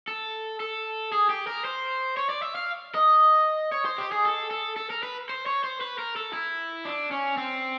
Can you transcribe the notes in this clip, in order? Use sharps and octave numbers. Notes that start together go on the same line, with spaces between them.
A4
A4
G#4
G4
A#4
C5
C#5
D5
E5
F5
D#5
C#5
C5
G4
G#4
A4
A4
A4
A#4
B4
C5
C#5
C5
B4
A#4
A4
E4
D4
C#4
C4